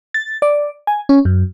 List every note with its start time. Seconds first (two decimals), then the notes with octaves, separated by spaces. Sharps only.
0.14 A6
0.42 D5
0.87 G#5
1.09 C#4
1.25 F#2